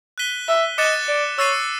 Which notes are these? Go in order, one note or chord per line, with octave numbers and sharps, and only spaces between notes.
F#6 B6 D#7 G7
E5
D#5 D6 F#6 A6 C#7 E7
D5
C#5 E6 A6 C7 D#7